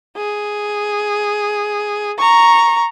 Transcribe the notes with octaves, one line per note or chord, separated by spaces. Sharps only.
G#4
A#5 C#6